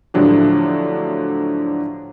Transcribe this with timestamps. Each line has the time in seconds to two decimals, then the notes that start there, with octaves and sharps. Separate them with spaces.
0.14 A2 D3 F3 F#3 D4 G4